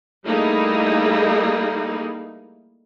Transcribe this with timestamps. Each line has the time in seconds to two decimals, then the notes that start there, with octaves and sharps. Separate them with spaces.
0.25 G3 A3 A#3 D#4 E4 G#4